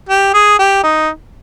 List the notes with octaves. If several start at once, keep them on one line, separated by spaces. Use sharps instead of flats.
G4
G#4
G4
D#4